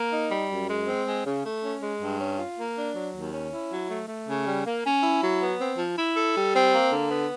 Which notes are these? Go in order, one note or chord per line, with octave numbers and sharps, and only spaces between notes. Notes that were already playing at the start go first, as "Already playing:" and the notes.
Already playing: A#3
D#4
G3
F#2
G#3
C4
G#3
C#3
A3
C#4
G#3
G2
C#4
F4
A#3
D4
F#3
D#2
C#4
E4
F#3
A3
A3
C#3
G3
A#3
C#4
E4
F#3
B3
C4
F3
E4
A4
G3
C4
A#3
D3
B3